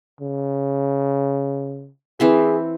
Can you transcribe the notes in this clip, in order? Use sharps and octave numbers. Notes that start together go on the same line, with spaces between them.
C#3
E3 C4 G#4 E5